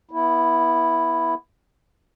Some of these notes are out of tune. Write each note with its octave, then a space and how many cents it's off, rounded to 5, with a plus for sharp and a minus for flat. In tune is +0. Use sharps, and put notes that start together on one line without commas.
B3 -25 E4 +0